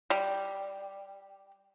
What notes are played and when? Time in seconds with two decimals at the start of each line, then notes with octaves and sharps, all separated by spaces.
0.10 G3